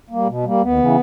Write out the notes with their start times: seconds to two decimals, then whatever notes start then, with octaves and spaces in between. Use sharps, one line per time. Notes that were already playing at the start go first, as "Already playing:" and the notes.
0.10 G3 A#3
0.27 B2
0.45 G3 A#3
0.62 D#2 B3
0.79 C#3 E3